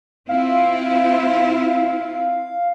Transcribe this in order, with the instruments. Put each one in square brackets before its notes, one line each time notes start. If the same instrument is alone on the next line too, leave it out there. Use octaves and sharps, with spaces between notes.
[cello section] C4 E4 F4 [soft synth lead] F5